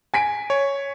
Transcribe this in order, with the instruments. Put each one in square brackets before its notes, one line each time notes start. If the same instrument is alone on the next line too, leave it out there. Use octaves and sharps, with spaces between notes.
[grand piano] G#5 B6 D7
[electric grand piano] C#5